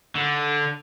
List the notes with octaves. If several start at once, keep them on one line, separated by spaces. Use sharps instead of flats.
D3